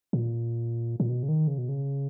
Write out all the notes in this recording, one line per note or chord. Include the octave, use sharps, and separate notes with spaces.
A#2
A#2
B2
C#3
D#3
C#3
B2
C#3